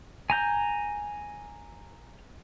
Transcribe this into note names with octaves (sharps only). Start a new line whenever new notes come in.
G#5 A#5 G6